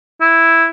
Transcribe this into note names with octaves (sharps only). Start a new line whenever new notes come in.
E4